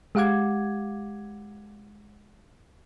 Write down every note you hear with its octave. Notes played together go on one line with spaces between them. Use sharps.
G#3 G4 F5 F#5 D6 G#6